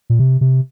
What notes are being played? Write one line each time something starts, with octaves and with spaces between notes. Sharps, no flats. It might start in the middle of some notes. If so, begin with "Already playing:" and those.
A#2
C3
C3